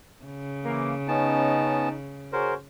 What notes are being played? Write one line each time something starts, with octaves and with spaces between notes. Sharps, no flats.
C#3
E3 A#3
B3 C#4 D#4 A5
F#4 G#4 A#4 C5 C#5